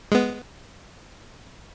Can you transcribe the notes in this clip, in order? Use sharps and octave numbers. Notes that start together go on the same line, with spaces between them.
G#3 B3